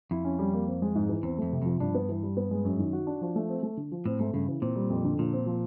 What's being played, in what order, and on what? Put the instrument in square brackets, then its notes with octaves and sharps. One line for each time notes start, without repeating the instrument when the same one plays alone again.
[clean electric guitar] F2 [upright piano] E4
[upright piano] C#4
G3
A#3
C4
G#3
G#2
E3
[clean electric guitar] E2 [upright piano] C4
[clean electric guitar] F2 [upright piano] A3
[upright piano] C3
[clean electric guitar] F2 [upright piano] F3
[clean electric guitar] G2 [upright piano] D4
[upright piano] B3
E3
G3
B3
G#3
F#2
D#3
F#4
D4
F3
A3
C4
A3
D3
F3
[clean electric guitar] A2 [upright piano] C4
[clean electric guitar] G#2 [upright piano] A3
[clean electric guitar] G2 [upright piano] C#3
[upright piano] E3
[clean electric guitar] A#2 [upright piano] C4
[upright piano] G3
F2
D3
[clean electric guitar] A#2 [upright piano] F3
[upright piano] C4
F3